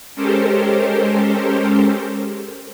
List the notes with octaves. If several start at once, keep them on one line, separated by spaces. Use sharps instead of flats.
G#3 C#4 G4 A4 A#4 C5